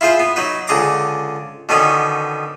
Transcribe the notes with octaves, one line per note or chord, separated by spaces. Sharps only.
E4 F4 G#4 C5
B3
F#3 D#4 B4
C#2 D3 G#4 A#5 D6 D#6
B2 D3 D#3 B3 C#4 D#4